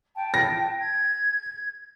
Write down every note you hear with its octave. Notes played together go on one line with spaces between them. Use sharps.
G5 A5
A#6
G#6